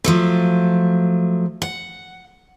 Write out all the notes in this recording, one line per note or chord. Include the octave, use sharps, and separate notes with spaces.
F3 F#3 A3
F#5